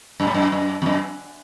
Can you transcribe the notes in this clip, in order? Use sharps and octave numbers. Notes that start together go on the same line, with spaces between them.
F#2
G#2
F#2
F#2
E2
F#2